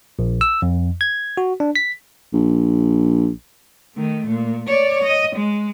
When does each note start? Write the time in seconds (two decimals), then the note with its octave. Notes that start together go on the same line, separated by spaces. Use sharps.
0.19 A#1
0.41 E6
0.62 F2
1.01 G#6
1.37 F#4
1.60 D4
1.76 B6
2.33 A#1
3.95 D#3 A3
4.27 A#2
4.66 C#5 D5
5.03 D#5
5.36 G#3